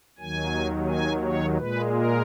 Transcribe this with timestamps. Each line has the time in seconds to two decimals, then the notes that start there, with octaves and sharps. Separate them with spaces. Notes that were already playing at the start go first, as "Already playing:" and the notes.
0.19 D#2 D#3 F#3 G#5
0.88 G#5
1.22 C#5
1.56 A#2 G#3 B4
1.91 A#4